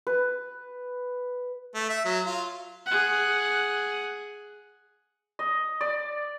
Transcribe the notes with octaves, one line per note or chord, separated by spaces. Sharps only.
B4
A3
E5
F#3
F4
G#4 F#5
D#5
D5